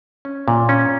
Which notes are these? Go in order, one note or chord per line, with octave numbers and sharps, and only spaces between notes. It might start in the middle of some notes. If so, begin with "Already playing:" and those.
C#4
A#2
C#4